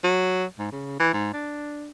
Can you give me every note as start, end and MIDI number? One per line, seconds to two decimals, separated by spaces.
0.03 0.45 54
0.59 0.72 44
0.72 0.95 49
1.00 1.10 52
1.13 1.32 44
1.33 1.91 62